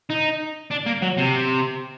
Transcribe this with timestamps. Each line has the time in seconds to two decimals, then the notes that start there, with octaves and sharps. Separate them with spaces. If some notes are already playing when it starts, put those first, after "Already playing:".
0.10 D#4
0.71 D4
0.87 A#3
1.02 F#3
1.18 C3